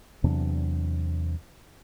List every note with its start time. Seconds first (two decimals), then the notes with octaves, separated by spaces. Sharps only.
0.24 E2 C3 F#3 D4